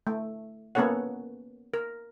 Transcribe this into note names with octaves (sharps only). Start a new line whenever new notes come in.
A3
A#3 B3 C#4 A4 C#5 F#5
A#4